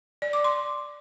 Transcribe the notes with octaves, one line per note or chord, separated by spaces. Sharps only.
D5
D6
C6